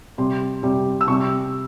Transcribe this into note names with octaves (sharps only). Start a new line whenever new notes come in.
C3 G3 C6
C3 G3
E6
C3 G3 C#6